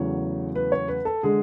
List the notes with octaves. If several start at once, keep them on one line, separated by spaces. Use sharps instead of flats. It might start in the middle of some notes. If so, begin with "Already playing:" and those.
Already playing: E2 C#3 F#3 A3 C#5
B4
C#5
B4
A4
D3 G#3 G#4